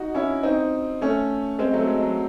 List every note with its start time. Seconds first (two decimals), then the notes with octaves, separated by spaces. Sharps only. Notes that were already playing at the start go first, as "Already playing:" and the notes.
Already playing: D#4 F#4
0.15 C#4 E4
0.43 C4 D#4
1.01 A3 C#4
1.59 G#3 C4
1.73 F#3 A3
1.88 G#3
2.02 F#3